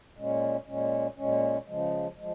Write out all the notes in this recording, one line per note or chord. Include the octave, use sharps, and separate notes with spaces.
A#2 G#3 C#4
A#2 G#3 C#4
A#2 G#3 C#4
C#3 F3 G#3
F3 G#3